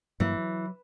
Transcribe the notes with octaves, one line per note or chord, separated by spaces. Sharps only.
G2 E3 F#3 A#3
F#3